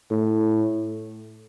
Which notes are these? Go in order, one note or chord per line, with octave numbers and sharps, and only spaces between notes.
A2